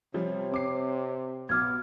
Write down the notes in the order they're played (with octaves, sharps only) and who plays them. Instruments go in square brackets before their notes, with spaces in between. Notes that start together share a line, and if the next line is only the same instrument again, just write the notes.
[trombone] C3 [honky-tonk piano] F3 G3 [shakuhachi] C#5
[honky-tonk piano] C4 D6 C7
[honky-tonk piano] B1 [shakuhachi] B3 [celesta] D6 F6 G#6